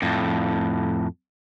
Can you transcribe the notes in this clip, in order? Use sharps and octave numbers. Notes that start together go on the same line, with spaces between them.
F2 A2